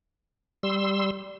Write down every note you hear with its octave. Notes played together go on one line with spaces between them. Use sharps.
G3 C6 E6